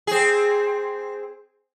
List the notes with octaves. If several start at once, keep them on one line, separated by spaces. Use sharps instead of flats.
C4 G#4